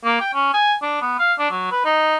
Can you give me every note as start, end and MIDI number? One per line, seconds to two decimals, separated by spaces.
0.04 0.16 58
0.21 0.32 79
0.34 0.53 61
0.54 0.74 80
0.82 0.97 62
1.02 1.18 59
1.19 1.33 77
1.39 1.50 62
1.51 1.68 54
1.71 1.84 71
1.85 2.17 63